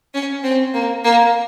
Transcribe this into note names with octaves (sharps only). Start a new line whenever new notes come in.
C#4
C4
A#3
A#3